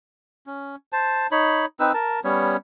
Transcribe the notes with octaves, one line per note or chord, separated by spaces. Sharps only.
C#4
C5 A5
D#4 C#5 B5
C4 D#4 B4 E6
A#4 A5
G3 B3 C#4 C#5